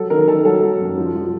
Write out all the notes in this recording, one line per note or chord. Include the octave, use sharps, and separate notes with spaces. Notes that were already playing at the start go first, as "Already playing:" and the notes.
Already playing: F#3 A4
D#3 A#4
D#3 A4
F#3 A4
F#3
F#2
F3
F3